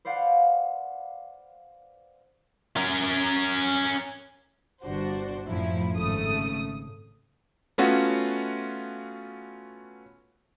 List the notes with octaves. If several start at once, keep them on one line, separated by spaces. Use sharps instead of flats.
B4 C5 D5 F5 F#5
C#4 A#4
G1 D4 F#4 C5
F#2 A2 F3 E4
G#1 C#3 A3 D#6
A3 B3 C#4 F4 F#4